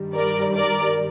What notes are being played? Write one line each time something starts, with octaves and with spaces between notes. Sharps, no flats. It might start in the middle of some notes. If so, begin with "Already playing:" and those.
Already playing: G2 D#3 G3
A#4 D5
A#4 D5